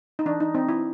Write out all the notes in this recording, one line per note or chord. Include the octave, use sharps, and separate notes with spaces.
D#4
E3 D4
D#4
C4 D#4
E4